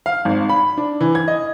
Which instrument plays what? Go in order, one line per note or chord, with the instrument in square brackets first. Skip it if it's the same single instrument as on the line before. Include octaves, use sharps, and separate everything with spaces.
[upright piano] F5
G#1
B5
D4
E3
G#6
D#5